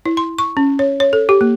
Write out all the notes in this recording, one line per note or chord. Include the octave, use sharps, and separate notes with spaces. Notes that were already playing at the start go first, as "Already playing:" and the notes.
E4
C6
C#6
C#4
C#5
C#5
A4
G4
A#3